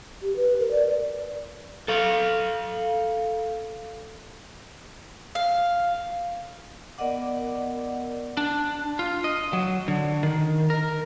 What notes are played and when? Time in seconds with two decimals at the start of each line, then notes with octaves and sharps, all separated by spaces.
0.22 G4
0.36 B4
0.59 A#4
0.71 D5
1.88 A4 F5
5.35 F5
6.98 B3 A#4 D5 D#5 F#5 D6
8.37 D4
8.99 F4
9.24 D#5
9.53 F#3
9.88 D3
10.23 D#3
10.70 A#4